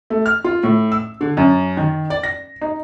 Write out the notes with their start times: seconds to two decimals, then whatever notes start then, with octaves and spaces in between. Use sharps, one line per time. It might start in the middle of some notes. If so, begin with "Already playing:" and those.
0.10 A3
0.26 F6
0.44 F4
0.63 A2
0.92 E6
1.21 D3
1.37 F#2
1.77 D#3
2.10 D5
2.23 A#6
2.61 D#4